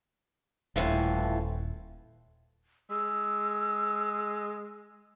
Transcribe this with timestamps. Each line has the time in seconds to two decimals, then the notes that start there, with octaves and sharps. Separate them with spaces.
0.76 D#1 A2 E3 F3
2.91 G#3 E6